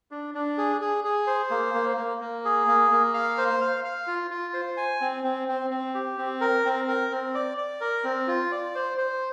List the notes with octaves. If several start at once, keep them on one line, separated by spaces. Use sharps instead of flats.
D4
D4
G#4
G#4
G#4
C5
A#3
A#3
A#3
A#3
G#4
A#3
A#3
F5
C5
F5
F5
F4
F4
C5
G#5
C4
C4
C4
C4
G4
C4
A#4
C4
A#4
C4
D5
D5
A#4
C4
F4
D5
C5
C5